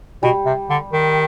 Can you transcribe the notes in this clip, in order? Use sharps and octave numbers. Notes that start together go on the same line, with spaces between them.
B2 G3
C3
D3
D#3